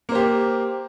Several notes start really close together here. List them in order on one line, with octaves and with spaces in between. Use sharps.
A#3 C5 G4